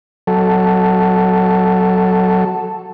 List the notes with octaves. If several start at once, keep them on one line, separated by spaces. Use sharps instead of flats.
F#3 A4